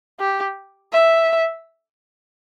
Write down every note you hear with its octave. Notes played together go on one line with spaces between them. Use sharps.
G4
E5